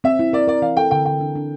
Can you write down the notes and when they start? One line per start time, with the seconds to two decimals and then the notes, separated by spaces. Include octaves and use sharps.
0.04 C4 E5
0.19 E4
0.33 A#4 D5
0.48 A#4 D5
0.62 E3 F5
0.77 A4 G5
0.91 D3 G5
1.05 D3 G5
1.21 D4
1.35 D4